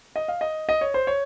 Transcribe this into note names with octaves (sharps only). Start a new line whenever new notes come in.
D#5
F5
D#5
D#5
C#5
C5
C#5